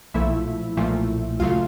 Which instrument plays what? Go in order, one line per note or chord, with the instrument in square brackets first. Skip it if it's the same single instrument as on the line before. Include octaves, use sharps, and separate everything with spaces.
[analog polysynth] B1 A#2 F3 A3 E4 E5
B1 A#2 F3 A3
D2 C#3 F#3 A3 F4 F5